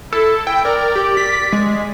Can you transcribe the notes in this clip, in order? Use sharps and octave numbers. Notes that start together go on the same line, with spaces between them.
E4 A4
E4 G5
A#4 D5
G4
B6
G#3